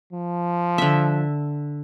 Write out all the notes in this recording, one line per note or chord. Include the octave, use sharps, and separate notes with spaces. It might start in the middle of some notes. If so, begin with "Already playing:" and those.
F3
D3 E5